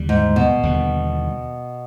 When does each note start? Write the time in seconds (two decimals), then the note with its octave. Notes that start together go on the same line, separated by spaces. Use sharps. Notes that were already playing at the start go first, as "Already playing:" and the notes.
Already playing: D#2 D3 G3
0.09 G#2
0.36 B2
0.63 D#2 D3 G3